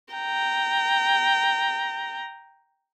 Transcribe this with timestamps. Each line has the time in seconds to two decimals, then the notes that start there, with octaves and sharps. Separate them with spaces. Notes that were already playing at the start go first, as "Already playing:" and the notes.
0.13 G5 A#5